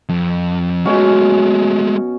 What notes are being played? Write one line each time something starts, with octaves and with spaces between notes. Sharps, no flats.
F2
B2 G#3 A3 C#4 F#4